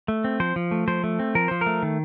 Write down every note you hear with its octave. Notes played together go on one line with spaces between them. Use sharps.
A3
C4
F3 C5
F3
A3
F3 C5
A3
C4
F3 A#4
F3 C5
A#4
A3
D#3